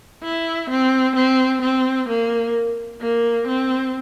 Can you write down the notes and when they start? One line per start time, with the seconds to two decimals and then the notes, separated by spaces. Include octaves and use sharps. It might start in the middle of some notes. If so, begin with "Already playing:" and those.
0.23 E4
0.70 C4
1.16 C4
1.62 C4
2.09 A#3
3.01 A#3
3.48 C4